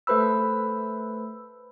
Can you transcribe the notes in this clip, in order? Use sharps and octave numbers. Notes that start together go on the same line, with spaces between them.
A3 A4 B4 C5 B5 E6